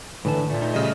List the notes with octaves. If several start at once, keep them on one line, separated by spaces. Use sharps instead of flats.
A2 D3 E3 A5
A#2 A3
D#4
C#3 G3 D#5